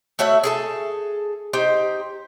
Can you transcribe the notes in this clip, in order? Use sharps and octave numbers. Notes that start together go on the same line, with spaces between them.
A3 F#4 C#5 E5
G#4 A4 A5
D#4 G4 C5